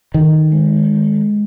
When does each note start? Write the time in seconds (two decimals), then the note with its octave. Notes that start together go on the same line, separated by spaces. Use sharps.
0.14 D#3 A4
0.52 G#3